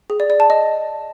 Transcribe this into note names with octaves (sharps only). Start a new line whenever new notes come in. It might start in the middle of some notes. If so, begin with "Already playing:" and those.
G#4
D5
D5
A5
D#5